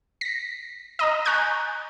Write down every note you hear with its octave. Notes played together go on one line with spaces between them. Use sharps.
A#6 B6
D#5 A#5 D#6
G#5 A#5 C#6 F#6 G6 A6